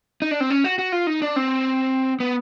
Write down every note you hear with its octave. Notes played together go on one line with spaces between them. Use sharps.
D#4
D4
C4
C#4
F#4
F#4
F4
D#4
D4
C4
B3